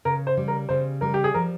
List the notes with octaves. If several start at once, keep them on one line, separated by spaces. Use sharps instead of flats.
C#3 A#4
C5
G3
A#4
C#3 C5
G3 A#4
G4
G#4
F3 A#4